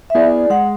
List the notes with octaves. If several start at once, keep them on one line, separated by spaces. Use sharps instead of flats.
E5
B3 E4 G#4 D5
G#3 F#5